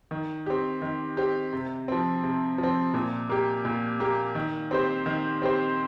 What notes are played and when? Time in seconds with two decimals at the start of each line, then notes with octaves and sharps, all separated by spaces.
0.11 D#3
0.46 C4 G4
0.82 D#3
1.17 C4 G4
1.53 C3
1.88 F3 C4
2.23 C3
2.58 F3
2.63 C4
2.94 A#2
3.29 A#3 G4
3.65 A#2
4.00 A#3 G4
4.35 D#3
4.71 C4 G4 C5
5.06 D#3
5.42 C4 G4 C5